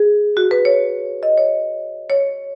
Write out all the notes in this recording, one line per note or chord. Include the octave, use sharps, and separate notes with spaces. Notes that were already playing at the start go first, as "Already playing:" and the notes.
Already playing: G#4
F#4
B4
C#5
D#5
C#5
C#5